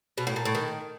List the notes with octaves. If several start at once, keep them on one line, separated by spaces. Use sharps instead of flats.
B2
A2
A#2
A2
D#3